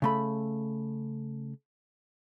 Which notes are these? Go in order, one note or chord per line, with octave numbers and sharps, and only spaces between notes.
C#3 A3 B5